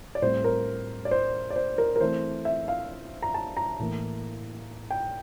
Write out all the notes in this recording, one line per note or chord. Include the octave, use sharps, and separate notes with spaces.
D5
A2 G3 C4 C5
A#4
D5
C5
D5
C5
A#4
A#4
E3 A3 C4 C5
E5
F5
A#5
A5
A#5
A2 E3 A#3
G5